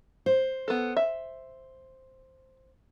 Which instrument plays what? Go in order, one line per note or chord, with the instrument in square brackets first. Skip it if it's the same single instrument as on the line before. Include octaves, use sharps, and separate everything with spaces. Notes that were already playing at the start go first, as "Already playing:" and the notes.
[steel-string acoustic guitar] C5
[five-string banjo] B3 A4
E5